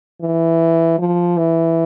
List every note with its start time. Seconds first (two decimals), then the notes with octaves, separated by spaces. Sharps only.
0.21 E3
0.99 F3
1.37 E3